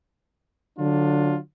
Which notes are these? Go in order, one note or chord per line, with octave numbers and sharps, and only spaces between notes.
D3 F#3 D4 F4